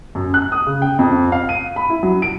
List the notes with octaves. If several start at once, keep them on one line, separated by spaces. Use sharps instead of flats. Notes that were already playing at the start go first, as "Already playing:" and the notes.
F#2
F#6
D#6
C#3
G5
F2
F5
D#7
B5
E4
F#3
D7